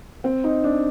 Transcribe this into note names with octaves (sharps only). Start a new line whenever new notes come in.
C4
D#4
D4